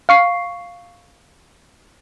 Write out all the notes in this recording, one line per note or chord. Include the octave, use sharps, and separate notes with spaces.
F5 C#6 C7